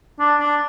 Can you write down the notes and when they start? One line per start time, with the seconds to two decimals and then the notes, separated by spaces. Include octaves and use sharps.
0.19 D4
0.40 D4